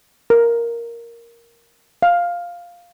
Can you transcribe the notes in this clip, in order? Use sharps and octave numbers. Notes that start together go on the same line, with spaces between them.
A#4
F5